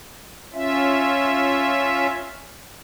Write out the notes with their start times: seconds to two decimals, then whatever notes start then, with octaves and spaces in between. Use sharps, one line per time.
0.54 C#4 F4 E5